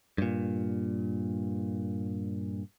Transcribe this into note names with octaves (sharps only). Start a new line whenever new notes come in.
G2 A#2